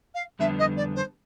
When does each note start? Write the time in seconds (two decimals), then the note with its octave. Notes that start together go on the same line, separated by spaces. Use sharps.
0.15 F5
0.39 F2 D3 G3 B3 D4 E5
0.59 D#5
0.77 D5
0.96 C5